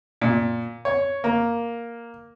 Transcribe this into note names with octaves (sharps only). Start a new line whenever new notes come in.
A#2
C#5
A#3